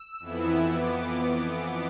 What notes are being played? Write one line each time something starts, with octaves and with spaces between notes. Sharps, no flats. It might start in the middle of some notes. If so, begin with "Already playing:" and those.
Already playing: E6
F2 E3 B3 E4
F2 E3 B3 D6